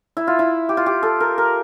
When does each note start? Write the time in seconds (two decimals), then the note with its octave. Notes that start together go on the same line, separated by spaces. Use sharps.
0.17 E4
0.27 F4
0.39 E4
0.69 G4
0.77 F4
0.86 G4
1.03 A4
1.20 A#4
1.38 A#4